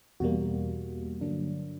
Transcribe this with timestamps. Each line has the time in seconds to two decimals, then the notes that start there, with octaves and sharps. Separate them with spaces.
0.20 E2 B2 G3 A#3 F#4
1.21 G2 D3 F#3 A#3 D4